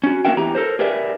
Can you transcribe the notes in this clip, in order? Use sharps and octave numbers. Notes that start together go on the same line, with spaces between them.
C#4 F#4
A#3 C#4 F#4 A#4 E5 G5
E2 E3 G4 A#5
A4 A#4 C5
G4 G#4 A#4 B4 D5 E5